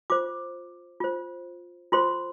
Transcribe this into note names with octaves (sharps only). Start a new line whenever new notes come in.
F4 C5 D6
F4 C5
F4 A4 C5 C6